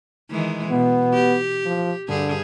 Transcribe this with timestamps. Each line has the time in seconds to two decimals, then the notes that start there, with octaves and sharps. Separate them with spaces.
0.31 D#3 E3 G#3
0.70 B2 B3
1.13 G4
1.66 F3
2.08 G2 D3 G#4